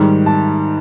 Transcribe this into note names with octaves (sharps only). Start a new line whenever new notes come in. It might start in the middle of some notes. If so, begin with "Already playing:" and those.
Already playing: G#2 D#3 G3
A5